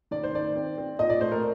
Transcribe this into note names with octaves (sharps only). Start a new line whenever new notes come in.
D#3 D5
C5
D#3 D5
C4
C4
A#2 D#5
D5
A3 C5
A#4